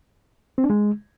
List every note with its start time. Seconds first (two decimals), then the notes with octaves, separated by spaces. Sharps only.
0.58 C4
0.64 D4
0.70 G#3